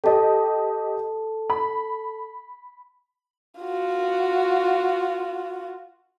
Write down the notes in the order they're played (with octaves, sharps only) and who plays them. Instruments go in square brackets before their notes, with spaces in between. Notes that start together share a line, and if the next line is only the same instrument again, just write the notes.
[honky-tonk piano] G4 D#5 [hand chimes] A4 A5
[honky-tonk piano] B5
[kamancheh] F4 F#4